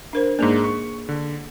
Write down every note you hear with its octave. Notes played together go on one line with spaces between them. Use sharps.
D4 A#4 C5
G#2 A#3 D4 G#4
C#6
D3